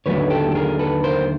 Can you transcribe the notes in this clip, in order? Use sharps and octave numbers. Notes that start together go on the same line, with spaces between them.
D#2 D3 F#3 A3 B4 C#5
G4 A4
A4
G#4 A#4
A4 B4
A#4 C5